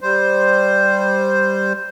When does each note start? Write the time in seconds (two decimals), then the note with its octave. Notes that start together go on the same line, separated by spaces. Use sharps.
0.01 G3 C5